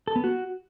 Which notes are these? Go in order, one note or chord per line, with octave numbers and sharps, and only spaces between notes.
A4
B3
F#4